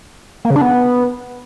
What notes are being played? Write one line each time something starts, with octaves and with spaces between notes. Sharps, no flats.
A#3
C#3
D4
B3